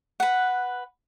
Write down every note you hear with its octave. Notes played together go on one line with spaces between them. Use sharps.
B4 F#5